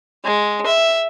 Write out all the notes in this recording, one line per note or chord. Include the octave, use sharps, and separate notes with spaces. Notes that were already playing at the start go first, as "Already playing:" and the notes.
G#3
E5